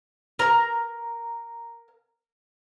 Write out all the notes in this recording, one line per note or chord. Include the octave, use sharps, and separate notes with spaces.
A#4 A#5